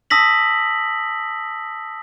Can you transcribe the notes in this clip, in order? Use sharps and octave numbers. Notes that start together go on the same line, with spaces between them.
A5 D#6 E6 A#6 B6 F#7